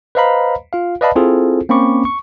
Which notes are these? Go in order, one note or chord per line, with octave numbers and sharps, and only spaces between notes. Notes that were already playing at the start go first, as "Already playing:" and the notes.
B4 C5 D#5 F5 A#5 B5
F4 F5
B4 D5 D#5 F5 A5 B5
C4 E4 F4 G#4 A4 C5
A#3 C4 C#4 B5 C#6 D6
C#6